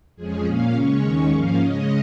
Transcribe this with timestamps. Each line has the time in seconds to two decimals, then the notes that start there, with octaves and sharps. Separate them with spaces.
0.16 F2 F3 G#3 C#4 G#4
0.45 A#2 A#3 C#4 F5
0.72 C#3 G#3 C#4 C#5
1.01 D#2 D#3 G#3 C#4 C#5
1.29 G#2 F3 A#3 C#4 F5
1.58 C#3 G#3 C#4 D#5